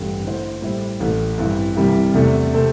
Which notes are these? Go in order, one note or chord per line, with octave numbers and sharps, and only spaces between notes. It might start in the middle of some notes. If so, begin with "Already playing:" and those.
Already playing: A1 G2 D3 G3 C4
D3 A3 E4 C5
A2 G3 E4 C5
A1 A2 A3
G2 E3 C4 E4
C2 C3 E3 G3 E4
E2 C3 A3 D4
C3 A3 C4 A4